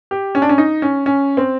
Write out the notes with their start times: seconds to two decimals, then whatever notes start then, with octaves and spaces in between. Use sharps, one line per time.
0.11 G4
0.35 C#4
0.42 D4
0.49 C#4
0.58 D#4
0.82 C#4
1.06 C#4
1.37 C4